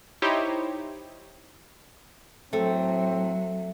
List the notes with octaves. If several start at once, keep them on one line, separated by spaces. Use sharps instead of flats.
D#4 E4 G4 C5 C#5
A2 F#3 A3 C4